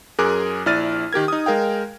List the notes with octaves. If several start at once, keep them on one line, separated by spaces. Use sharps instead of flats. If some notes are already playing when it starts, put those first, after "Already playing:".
F#2 G#4 A#4 D6 F#6
A#1 E4 D5 F6 A6 D#7
D#3 G4 A#4 G#6
D#4 D#6
G#3 A#4 F5 G5